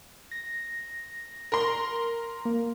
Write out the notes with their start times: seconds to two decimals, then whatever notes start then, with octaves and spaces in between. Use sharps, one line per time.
0.31 A#6
1.52 A#4 C6
2.45 A#3